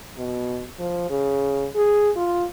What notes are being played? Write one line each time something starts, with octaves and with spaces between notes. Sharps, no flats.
B2
F3
C#3
G#4
F4